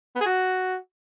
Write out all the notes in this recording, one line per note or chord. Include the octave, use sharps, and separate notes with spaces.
B3
G#4
F#4